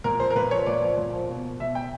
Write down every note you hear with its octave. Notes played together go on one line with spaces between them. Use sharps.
A#2 A#4
F3 C5
A#4
A#2 B4
F3 C#5
A#2 D5
F3
A#2
F3
B2
B2 E5
G5